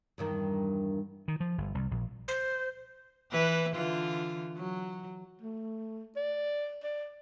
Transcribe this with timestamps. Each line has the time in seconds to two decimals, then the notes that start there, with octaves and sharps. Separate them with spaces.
0.18 E2 G2 D#3
1.28 D#3
1.40 F3
1.58 G1
1.75 C2
1.91 A#1
2.28 C5
3.31 E3 B4
3.75 D3 E3 F4
4.56 F#3
5.41 A3
6.16 D5
6.83 D5